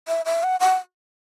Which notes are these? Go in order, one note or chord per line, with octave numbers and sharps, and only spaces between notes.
E5
E5
F#5
F#5